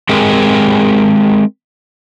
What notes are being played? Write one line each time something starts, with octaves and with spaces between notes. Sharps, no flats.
G#3 C4 G4 G#4 A#4